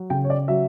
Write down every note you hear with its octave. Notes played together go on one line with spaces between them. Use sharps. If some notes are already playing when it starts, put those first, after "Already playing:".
Already playing: F#3
C#3 G5
C#5
D5
F#3 E5